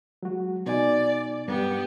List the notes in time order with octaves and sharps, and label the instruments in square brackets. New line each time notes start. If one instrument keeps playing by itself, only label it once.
[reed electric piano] F#3 G#3 F#4
[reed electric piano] B2 D#4 G#5 [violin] D5
[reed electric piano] G2 [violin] B3 G4